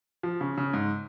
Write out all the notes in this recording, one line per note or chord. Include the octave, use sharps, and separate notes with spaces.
F3
C#3
C#3
G#2